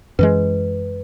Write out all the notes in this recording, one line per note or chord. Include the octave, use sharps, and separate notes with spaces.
F#2 E3 G#3 B4